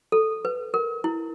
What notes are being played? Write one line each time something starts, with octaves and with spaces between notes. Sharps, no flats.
A4
B4
A#4
E4